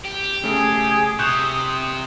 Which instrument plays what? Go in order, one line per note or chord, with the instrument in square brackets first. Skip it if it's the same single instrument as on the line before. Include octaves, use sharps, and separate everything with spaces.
[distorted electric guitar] G4
[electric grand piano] C#3 A3 [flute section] G#4
[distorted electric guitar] C3 [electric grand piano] C#6 F#6 G6 [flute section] D#6